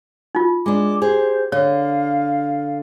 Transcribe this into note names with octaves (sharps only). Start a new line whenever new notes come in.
D#4 F4
G#3 D4 D6
G4 G#4 C5
D3 C#5 F5